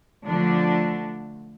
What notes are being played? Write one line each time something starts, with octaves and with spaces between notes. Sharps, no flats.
D3 F3 A3 D4